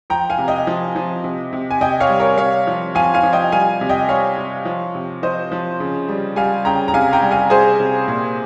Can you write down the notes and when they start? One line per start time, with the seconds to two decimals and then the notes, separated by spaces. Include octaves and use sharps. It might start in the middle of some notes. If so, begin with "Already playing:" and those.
0.10 F3 G5 A#5
0.30 F5 G#5
0.39 C3
0.48 D#5 G5
0.67 F3
0.96 F3
1.24 C3
1.53 C3
1.71 G#5
1.81 C3 D#5 G5
2.00 C#5 F5
2.09 G3
2.19 A#4 C#5
2.37 C3 C#5 F5
2.67 F3
2.95 F3 F5 G#5
3.14 F5 G#5
3.23 F3
3.33 D#5 G5
3.52 G3 F5 G#5
3.81 C3
3.89 D#5 G5
4.09 G3 C#5 F5
4.37 C3
4.65 F3
4.95 C3
5.23 F3 C5 D#5
5.52 F3
5.80 C#3
6.08 G3
6.36 G3 F5 G#5
6.65 C#3 G5 A#5
6.88 A#5
6.94 C3 F5 G#5
7.13 G5 A#5
7.22 G3
7.31 F5 G#5
7.50 C3 G#4 C5
7.80 C3
8.08 A#2